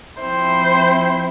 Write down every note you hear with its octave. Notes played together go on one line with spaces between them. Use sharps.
F3 C4 E4 C5